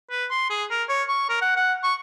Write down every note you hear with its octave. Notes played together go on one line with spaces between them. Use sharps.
B4
C6
G#4
A#4
C#5
C#6
A#4
F#5
F#5
C#6